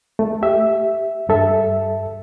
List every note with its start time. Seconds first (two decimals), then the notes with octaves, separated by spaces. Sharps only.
0.19 A3
0.42 G4 E5
1.29 G2 A4 E5